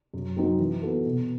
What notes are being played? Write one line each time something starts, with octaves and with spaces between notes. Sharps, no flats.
F#2
F#3 C4 D#4 F#4
E3
B3 F#4 A4
B2